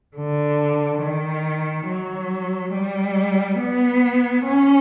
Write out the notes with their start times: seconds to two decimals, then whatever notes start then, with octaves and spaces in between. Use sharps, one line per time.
0.17 D3
1.02 D#3
1.87 F#3
2.73 G3
3.58 B3
4.45 C#4